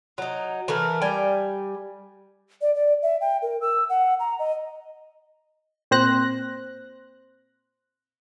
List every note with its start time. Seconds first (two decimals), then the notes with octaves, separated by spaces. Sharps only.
0.18 F#3 D#4
0.68 E3 A3 A#4
1.02 G3 G5 G#5
2.61 D5
2.75 D5
3.03 E5
3.21 G5
3.42 A#4
3.61 E6
3.89 F#5
4.20 A#5
4.39 D#5
5.91 A#2 C4 C5 F#6 A#6